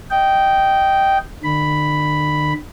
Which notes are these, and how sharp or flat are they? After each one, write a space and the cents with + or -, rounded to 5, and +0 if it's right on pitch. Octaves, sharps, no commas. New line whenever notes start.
D#5 +0 G5 -10
D3 +40 B5 +0